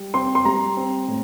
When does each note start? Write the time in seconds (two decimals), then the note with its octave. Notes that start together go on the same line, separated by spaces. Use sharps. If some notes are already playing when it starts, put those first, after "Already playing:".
Already playing: G3
0.14 C4 C6
0.35 C6
0.45 G3 A#5
0.77 C4
1.08 A2